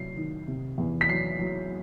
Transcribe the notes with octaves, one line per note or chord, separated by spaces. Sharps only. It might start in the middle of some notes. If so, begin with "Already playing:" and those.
Already playing: C3 F#3 C7
D#3
C3
E2
B6
F#3 C7
F#3